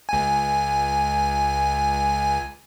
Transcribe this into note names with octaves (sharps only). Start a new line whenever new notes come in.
C#2 G#5